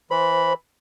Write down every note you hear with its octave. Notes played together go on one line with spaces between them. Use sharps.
E3 C5 B5